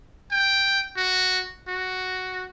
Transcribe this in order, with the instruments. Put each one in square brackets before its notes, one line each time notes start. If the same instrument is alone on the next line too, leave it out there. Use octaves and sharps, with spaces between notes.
[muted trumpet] G5
F#4
F#4